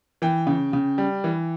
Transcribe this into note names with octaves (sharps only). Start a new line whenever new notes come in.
E3 G5
C#3
C#3
G3
E3